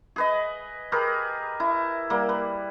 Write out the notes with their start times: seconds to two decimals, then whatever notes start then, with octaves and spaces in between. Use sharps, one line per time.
0.16 G#4 B4 D#5
0.92 G4 G#4 A#4 B4
1.60 E4
2.10 G3 A#3
2.29 B4